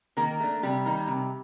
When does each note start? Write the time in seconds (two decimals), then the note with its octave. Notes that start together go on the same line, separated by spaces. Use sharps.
0.17 D#3 A#3 A#4
0.40 A3 D4
0.63 C3 G3 G4
0.85 D#3 A#3 D#4
1.07 C3